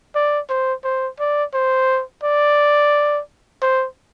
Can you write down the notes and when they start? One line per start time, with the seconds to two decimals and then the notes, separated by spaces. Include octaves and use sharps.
0.15 D5
0.49 C5
0.84 C5
1.20 D5
1.54 C5
2.24 D5
3.62 C5